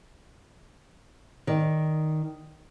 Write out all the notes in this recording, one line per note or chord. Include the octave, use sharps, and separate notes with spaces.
D#3 D5